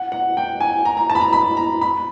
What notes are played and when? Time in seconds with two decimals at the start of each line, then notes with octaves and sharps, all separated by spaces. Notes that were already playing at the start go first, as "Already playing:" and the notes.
Already playing: F#5
0.12 F#5
0.37 G5
0.60 G#5
0.85 A#5
0.97 A#5
1.10 A5
1.15 B5
1.21 A#5
1.33 B5
1.57 A#5
1.81 B5